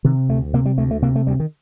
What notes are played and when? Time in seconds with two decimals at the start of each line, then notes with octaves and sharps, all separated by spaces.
0.04 C3 D#3
0.29 D2 A3
0.54 C3 A#3
0.66 G3
0.78 D2 A3
0.91 A3
1.02 C3 A#3
1.16 A3
1.27 D2 G3
1.40 D#3